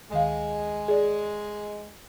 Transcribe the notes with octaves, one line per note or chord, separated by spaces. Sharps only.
D2 D#3 G#3 F5
G#4 D5